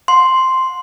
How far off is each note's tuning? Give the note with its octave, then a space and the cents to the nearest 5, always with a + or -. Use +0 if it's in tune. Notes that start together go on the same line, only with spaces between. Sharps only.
F#5 -40 C6 +0